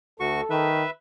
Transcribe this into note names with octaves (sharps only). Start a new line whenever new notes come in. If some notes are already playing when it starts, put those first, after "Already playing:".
D2 F#4 A4 C#6
D#3 B4 E5